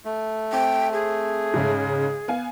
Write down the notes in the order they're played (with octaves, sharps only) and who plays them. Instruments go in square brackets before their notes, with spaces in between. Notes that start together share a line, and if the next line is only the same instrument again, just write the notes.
[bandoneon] A3
[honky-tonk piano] C4 [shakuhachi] G5
[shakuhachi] G#4
[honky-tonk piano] G#2 C#3
B3 F5 G#5